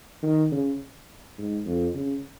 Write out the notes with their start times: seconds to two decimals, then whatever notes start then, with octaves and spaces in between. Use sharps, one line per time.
0.23 D#3
0.52 C#3
1.38 G#2
1.66 F2
1.94 C#3